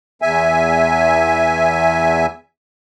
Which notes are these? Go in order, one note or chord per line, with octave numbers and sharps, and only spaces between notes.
E2 E5 G#5